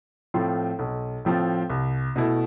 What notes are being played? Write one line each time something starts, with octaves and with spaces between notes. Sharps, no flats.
A2 F3 C4 F4
B1
A2 F3 C4 F4
C2
B2 A3 E4